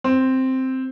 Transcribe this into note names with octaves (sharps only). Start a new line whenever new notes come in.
C4